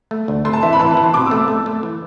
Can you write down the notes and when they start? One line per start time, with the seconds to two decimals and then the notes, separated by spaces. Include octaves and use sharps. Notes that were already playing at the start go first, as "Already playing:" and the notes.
0.11 A3
0.28 D2
0.45 A3 C6
0.53 A5
0.63 E3 E5
0.73 B5
0.79 E3 A5
0.91 A5
0.97 E3
1.03 C6
1.14 B2 D6
1.26 E6
1.31 A3
1.36 E6
1.48 A3
1.66 A3
1.83 E3